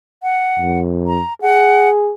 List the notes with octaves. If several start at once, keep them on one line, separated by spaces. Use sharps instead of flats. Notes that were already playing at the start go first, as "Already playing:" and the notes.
F#5
F2
A#5
G#4 F#5